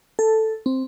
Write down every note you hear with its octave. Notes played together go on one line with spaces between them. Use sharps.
A4
C4